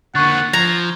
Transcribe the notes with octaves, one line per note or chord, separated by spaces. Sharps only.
D3 A#3 F#5 C#6 F#6 A6
F3 A#5 G#6